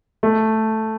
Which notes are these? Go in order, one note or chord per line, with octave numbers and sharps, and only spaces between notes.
A3